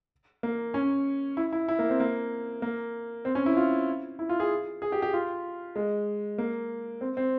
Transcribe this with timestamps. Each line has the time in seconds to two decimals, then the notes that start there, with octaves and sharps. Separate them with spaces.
0.43 A#3
0.74 C#4
1.37 E4
1.53 E4
1.68 E4
1.79 A#3
1.89 C4
2.00 A#3
2.62 A#3
3.25 C4
3.35 C#4
3.46 E4
3.57 F4
4.19 E4
4.29 F4
4.40 G#4
4.82 G#4
4.92 G4
5.02 G4
5.14 F4
5.76 G#3
6.38 A#3
7.01 C4
7.17 C4